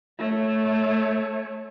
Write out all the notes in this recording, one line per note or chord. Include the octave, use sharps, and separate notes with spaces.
A3 C#5